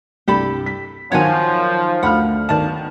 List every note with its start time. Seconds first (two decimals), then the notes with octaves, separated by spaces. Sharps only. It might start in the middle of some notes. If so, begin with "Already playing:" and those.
0.28 C2 G2 G4 A4 B5
0.66 B6
1.12 D#3 F3 F#3 C#5 F#5 G#5
2.03 D2 F5 F#5 B5 F6
2.49 D#3 B3 D5 A5